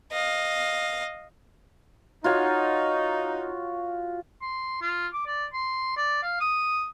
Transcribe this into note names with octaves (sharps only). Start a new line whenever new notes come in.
D#5 F5
D#4 F4 F#4 C#5
C6
F4
D6
D5
C6
D5
F5
D#6